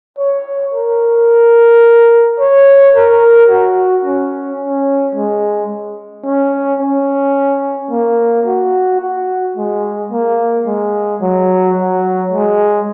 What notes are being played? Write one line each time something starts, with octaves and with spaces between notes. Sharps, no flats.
C#5
A#4
C#5
A#4
F#4
C#4
C#4
G#3
C#4
C#4
A#3
F#4
F#4
G#3
A#3
G#3
F#3
F#3
G#3